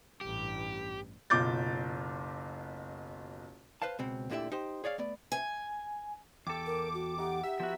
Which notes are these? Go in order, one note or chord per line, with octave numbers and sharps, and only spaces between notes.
A1 G2 G4
F#1 B1 F4 D6 G6 A6
B4 C5 F5 A5
C#2 B2 C4
D2 A#2 D3 E4 G4 E5
D#4 G4 C5
G#4 C#5 D5 F5
A3 B3 D5
G#5
E2 G4 A4 D6
A#4
F#4
D#4 G4 F#5
G4 E5
F3 B3 F#4